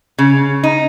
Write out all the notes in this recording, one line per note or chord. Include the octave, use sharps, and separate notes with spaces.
C#3
D#4